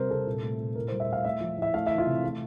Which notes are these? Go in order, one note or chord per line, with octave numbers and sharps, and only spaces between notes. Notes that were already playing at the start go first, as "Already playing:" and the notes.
Already playing: C3 G3 A#4 C5
C3 A4
A#2
A3
A#2
A2 A#4
G3 C5
E5
A2 F5
A3 E5
F3
A2 E5
A3 F5
E3 E5
F4
C3
A3